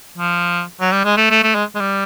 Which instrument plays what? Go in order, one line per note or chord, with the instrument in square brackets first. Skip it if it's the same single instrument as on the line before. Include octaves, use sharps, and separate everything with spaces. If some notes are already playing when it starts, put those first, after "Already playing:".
[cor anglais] F3
F#3
G3
G#3
A3
A3
A3
G#3
G#3
G3